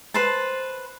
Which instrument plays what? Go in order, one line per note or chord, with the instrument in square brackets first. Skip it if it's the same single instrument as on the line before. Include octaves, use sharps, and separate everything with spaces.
[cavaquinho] B4 C5 A5